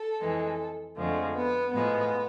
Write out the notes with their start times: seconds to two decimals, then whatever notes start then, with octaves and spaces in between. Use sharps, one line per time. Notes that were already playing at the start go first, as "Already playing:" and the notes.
Already playing: A4
0.20 F2 E3 G#3
0.97 F2 D3 F3 G#3 A3
1.36 B3
1.74 A2 F3 G#3 B3